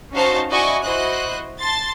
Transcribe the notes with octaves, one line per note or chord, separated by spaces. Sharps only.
C#4 D#4 F#4 C5 F5 A5
E4 F#4 D5 D#5 G#5 C#6
E4 F#4 C5 D#5 F#6
A5 C6 A6